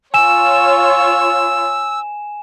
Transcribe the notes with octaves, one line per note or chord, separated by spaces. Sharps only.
F4 C#5 G#5 E6 E7